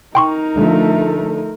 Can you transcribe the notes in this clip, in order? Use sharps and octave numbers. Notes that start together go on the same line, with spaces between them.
D#4 A#4 G5 C6 C#6
D3 F3 A3